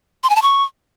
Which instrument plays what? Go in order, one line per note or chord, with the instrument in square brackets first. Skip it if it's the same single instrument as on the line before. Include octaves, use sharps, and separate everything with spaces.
[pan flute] C6
G#5
A5
C#6